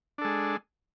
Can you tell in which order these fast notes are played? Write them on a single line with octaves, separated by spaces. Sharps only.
D4 A4 G#3